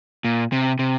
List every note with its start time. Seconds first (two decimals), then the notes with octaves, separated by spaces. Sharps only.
0.24 A#2
0.52 C3
0.79 C3